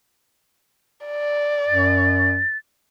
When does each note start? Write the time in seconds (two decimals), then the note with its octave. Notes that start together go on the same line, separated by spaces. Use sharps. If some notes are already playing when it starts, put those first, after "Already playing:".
1.06 D5
1.68 F#2 A6